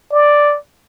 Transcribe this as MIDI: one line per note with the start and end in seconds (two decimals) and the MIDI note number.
0.12 0.57 74